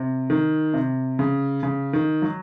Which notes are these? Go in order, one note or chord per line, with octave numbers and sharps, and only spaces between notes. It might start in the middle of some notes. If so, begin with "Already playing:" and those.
Already playing: C3
D#3
C3
C#3
C#3
D#3
F#3